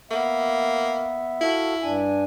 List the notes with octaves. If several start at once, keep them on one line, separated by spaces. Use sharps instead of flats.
A#3 B3 E5
E4 F#4 A4 F5
G2 D4 G#5